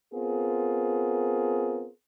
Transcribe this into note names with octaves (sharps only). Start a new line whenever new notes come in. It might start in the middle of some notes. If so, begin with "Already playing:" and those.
B3 C4 F4 G#4 A#4